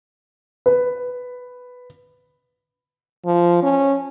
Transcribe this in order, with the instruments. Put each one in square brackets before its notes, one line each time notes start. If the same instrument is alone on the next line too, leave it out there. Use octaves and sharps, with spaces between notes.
[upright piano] B4
[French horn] F3
C#4